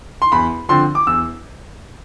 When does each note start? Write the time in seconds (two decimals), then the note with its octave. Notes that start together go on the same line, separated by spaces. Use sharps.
0.22 C6
0.32 E2 B5
0.69 D3 F3 C4 C6
0.95 D6
1.07 E2 E6